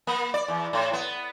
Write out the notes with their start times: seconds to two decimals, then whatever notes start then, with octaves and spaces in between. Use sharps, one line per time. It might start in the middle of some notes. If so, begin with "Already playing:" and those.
0.07 A#3
0.34 D5
0.48 E2
0.73 A2
0.93 B3